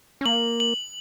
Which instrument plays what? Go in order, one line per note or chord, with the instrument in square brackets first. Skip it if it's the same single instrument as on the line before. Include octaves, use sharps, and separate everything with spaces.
[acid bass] C#4
[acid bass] A#3 [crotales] F#7
[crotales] F#7